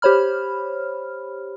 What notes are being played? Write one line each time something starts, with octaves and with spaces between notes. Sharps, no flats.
G4 C5 C#5 B5 F6